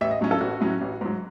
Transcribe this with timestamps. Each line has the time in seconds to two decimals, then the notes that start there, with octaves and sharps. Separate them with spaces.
0.01 A1 E5
0.11 D#5
0.21 A2 F#3 C#4
0.31 A4
0.40 A1 F#4
0.61 A2 F#3 C#4
0.81 A1
1.01 G#2 F#3